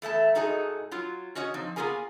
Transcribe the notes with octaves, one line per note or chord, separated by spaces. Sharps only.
E2 A3 E5 A5
G#2 D#4 F#4 G#4 A4
F#3 F4
C#4 F#4 C#5 D#5
F3 C4 D#4
A#3 B3 F4 G#4 A#4 G#5